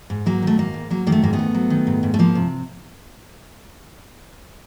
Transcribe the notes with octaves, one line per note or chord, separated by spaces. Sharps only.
G#2
F#3 A#3
D#3 A3
G#2 A#3
G#2
F#3 A#3
D#3 A#3
A3
G#2 A#3
A3 B3
G#2
F#3
D#3
G#2
G#2
A3
F3 A#3
C3